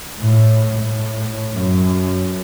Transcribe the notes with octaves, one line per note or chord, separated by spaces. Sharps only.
A2
A2
F#2